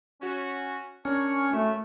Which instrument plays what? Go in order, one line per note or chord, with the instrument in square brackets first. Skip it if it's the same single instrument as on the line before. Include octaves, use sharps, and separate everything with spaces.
[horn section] C#4 F#4
[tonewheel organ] C#4 [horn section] D4 A#4 C#5
[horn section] F#2 A2 E5 [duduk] A3